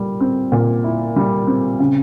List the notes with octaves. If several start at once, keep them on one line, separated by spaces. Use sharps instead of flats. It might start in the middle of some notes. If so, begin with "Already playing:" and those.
Already playing: A#2 G3
C4
A#2
E4
G3
C4
C#3